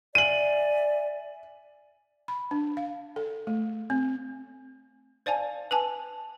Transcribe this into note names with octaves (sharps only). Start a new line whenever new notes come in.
D5 E5 G#5 D#7 F#7
B5
D4
F5
A4
A3
C4
C5 D5 F5 G#5 A5
B4 G#5 A5